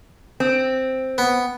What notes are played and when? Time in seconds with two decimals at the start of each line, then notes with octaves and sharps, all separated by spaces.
0.40 C4
1.18 B3